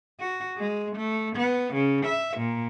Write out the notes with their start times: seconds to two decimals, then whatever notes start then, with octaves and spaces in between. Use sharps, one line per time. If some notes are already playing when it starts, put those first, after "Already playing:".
0.20 F#4
0.57 G#3
0.96 A3
1.36 B3
1.74 C#3
2.06 E5
2.37 A#2